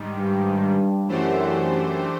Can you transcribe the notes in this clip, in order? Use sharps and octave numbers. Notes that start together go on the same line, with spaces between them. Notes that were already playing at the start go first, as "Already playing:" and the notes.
Already playing: G#2 D#3 G3
G2
F#2 E3 A3 D4 G4 C5